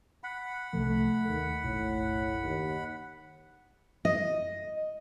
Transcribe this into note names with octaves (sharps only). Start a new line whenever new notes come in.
F#5 B5
C2 C3 F3 A3
D#2 D#3
F#1 B1 A2
D#2
D#5